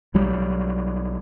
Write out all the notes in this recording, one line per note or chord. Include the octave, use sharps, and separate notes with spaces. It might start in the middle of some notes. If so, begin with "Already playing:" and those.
B1 F#3 G3